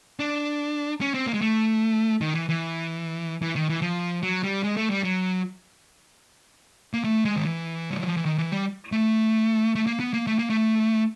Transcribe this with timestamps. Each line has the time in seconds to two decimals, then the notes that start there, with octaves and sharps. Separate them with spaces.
0.19 D4
1.01 C#4
1.14 C4
1.27 A#3
1.34 G#3
1.41 A3
2.21 D#3
2.35 E3
2.49 E3
3.42 E3
3.56 D#3
3.69 E3
3.82 F3
4.23 F#3
4.43 G3
4.63 G#3
4.77 A3
4.90 G3
5.04 F#3
6.94 A#3
7.04 A3
7.25 G#3
7.36 D#3
7.45 E3
7.90 G3
7.99 F#3
8.08 F3
8.17 E3
8.25 D#3
8.38 E3
8.52 G3
8.92 A3
9.75 A3
9.87 A#3
10.00 B3
10.13 A#3
10.27 A3
10.39 A#3
10.50 A3